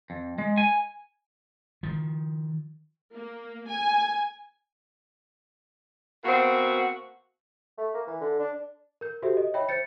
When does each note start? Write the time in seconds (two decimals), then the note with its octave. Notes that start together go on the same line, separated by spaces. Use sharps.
0.10 F2
0.38 G#3
0.58 G#5
1.83 D#3 F3
3.14 A#3
3.68 G#5
6.24 B2 A#3 C4 F#4
7.78 A3
7.95 A#3
8.07 E3
8.21 D3
8.39 D4
9.01 A#4 G6
9.22 F#4 G4 A4 C5 E5
9.37 D#5
9.54 C#5 E5 G5 B5
9.69 C5 G6 A6 C#7